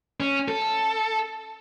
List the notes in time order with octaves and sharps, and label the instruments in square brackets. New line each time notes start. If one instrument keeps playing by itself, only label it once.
[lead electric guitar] C#4
A4